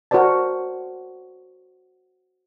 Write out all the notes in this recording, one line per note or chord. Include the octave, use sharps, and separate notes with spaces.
F#4 A#4 C5 D5 A5